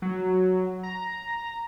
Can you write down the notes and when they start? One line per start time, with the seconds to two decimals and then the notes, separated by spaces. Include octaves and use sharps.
0.02 F#3
0.83 A#5